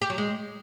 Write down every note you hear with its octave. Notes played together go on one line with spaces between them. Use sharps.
G4
F#3
G#3